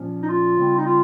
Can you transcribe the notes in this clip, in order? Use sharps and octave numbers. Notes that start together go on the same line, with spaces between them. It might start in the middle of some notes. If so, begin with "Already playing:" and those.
Already playing: A#2 F3 A#3 C#4
D#4
F4
C#3 G3 C4
D#4
F4